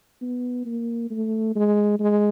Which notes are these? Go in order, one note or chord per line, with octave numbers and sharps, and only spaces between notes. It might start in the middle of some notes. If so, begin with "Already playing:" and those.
B3
A#3
A3
G#3
G#3